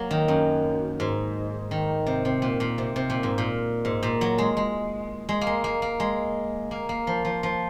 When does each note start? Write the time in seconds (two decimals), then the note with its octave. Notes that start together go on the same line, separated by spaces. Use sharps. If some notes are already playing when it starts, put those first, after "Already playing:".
Already playing: F#3 A#3
0.11 D#3
0.28 F#2
1.00 G#2
1.71 D#3
2.07 C3
2.25 C3
2.42 A#2
2.60 A#2
2.78 C3
2.96 C3
3.10 A#2
3.23 G#2
3.38 A#2
3.85 G#2
4.03 A#2
4.21 F#3
4.38 G#3
4.57 G#3
5.29 G#3
5.41 A#3
5.47 G#3
5.64 A#3
5.82 A#3
6.00 G#3
6.71 A#3
6.89 A#3
7.07 F3
7.25 F3
7.43 F3